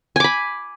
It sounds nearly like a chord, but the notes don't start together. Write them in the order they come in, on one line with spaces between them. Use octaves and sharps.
G#5 D6 B5